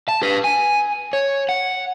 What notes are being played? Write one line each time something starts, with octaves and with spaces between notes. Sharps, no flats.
A5
G4 B4
G#5
C#5
F#5